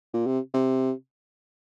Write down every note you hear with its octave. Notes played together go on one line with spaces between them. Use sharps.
A#2
C3
C3